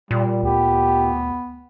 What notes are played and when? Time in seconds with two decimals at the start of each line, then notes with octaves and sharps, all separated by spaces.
0.11 A#2 G3
0.43 D2 B3 G4